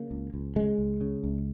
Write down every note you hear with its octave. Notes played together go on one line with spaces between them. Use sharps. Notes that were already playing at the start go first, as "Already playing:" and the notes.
Already playing: C#3 A#3
C#2
C#2
C#3 G#3
C#2
C#3
C#2